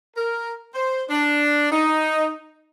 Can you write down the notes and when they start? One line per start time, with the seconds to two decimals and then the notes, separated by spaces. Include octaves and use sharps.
0.16 A#4
0.75 C5
1.10 D4
1.72 D#4